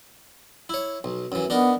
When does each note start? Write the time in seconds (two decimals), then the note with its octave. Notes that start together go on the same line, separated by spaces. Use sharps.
0.69 E4 C#5
1.04 B1
1.32 F#2 E3
1.50 B3 D4 D#4 A#4